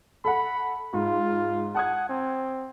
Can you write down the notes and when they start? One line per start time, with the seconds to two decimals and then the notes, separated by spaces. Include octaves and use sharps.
0.25 A4 F#5 B5
0.94 G#2 F4
1.75 F#5 A5 D#6 G#6
2.09 C4